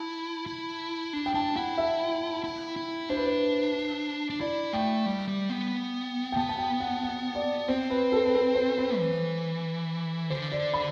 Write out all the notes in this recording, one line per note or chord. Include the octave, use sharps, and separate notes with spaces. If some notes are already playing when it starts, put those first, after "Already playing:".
Already playing: E4 A5
E4
D4
G5
D4 A5
E4 F#5
E5
E4
E4
D4 C5
B4
C5
D4
E4 D5
A3 G5
G3
G3
B3
G5
B3 A5
A5
G5
F#5
F#5
D5
C4 C5
B4
A4
B4
A4
C5
B4
E3
D3 C5
D5
B5